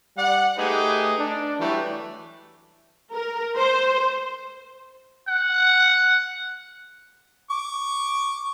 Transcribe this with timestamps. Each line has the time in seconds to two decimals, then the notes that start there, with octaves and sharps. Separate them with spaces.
0.17 G3 D5 F#5
0.58 A3 D#4 G4 G#4 B4
1.18 D4
1.59 E3 F#3 G3 A3
3.12 A#4
3.57 C5
5.28 F#5
7.50 C#6 D6